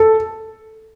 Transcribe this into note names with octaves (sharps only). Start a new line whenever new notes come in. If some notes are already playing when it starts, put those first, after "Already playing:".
Already playing: A4